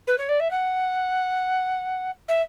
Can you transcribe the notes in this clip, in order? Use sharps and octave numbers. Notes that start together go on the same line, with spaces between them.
B4
C#5
D5
E5
F#5
E5